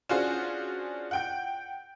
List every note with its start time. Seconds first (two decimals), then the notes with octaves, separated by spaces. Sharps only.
0.09 C#4 D4 F4 F#4 G#4 C5
1.11 F#5 G5 G6